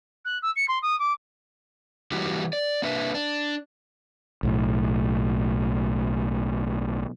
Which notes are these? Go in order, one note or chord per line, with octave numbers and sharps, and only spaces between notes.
F#6
E6
C#7
C6
D#6
D6
E3 G3 A#3 E4 F#4 G4
D5
A#3 D4 B4 E5
D4
B1 A2